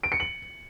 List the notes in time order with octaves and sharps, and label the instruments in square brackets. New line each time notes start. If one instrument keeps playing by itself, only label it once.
[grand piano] D7
C#7
F#7